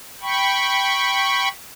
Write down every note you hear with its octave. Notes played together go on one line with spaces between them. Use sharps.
G5 B5 C#6